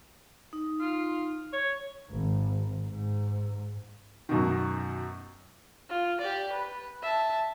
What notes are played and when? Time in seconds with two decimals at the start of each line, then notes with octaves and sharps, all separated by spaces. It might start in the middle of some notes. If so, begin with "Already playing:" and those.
0.53 D#4
0.80 F4
1.53 C#5
2.11 G#1
2.88 G#2
4.29 F#2 B2 D#3
5.89 F4
6.21 G4 D5
6.52 B4
7.03 E5 A5